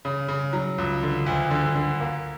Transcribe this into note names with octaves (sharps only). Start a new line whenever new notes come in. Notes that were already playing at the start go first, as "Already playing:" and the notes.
C#3
C#3
F#3
C#2
D3
D2
D3
D3
A#3